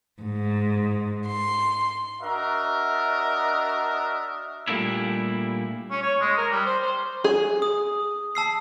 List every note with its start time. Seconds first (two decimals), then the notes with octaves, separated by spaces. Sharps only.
0.22 G#2
1.27 C6
2.21 D4 F#4 A#4 D#5 E5
4.68 A#2 G3 A3 A#3 D4 E4
5.91 C#4
6.02 C#5
6.21 G#3
6.38 A#4
6.51 G3
6.66 C5
6.83 C5
7.24 G#4
7.62 D#6
8.35 A5 E6 C7